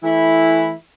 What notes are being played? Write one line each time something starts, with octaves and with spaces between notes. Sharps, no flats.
E3 A3 E4